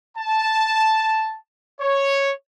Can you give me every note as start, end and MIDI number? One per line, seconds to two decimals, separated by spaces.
0.18 1.36 81
1.81 2.31 73